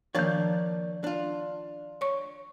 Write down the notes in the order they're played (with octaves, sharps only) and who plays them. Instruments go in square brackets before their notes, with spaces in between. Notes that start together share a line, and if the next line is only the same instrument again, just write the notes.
[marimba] D#3 F3 [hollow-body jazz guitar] A#3 D4 C#5
[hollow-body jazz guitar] D4 F4
[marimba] C#5 C#6